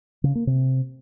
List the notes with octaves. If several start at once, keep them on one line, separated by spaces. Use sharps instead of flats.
C#3
A#3
C3